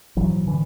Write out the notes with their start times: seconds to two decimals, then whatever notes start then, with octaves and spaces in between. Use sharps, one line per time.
0.17 A#1 G#2 E3 F#3
0.47 D3 E3